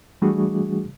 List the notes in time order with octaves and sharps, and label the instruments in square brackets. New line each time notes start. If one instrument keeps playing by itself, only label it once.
[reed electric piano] E3 G3 A3 D4 F#4 G#4